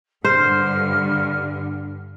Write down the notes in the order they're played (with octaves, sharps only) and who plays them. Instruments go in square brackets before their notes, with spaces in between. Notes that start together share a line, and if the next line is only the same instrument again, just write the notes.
[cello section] G2 D3 [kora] C5 [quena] F6